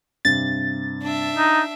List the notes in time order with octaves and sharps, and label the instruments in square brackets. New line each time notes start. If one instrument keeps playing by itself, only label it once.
[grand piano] G2 C3 [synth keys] A6
[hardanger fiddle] D4 E5
[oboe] D#4